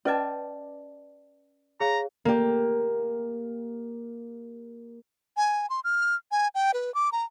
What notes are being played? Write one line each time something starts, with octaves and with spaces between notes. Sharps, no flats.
C#4 B4 D5 D#5 G5 A5
G#4 C#5 F5 A#5
A#3 G4
G#5
C6
F6
G#5
G5
B4
D6
A#5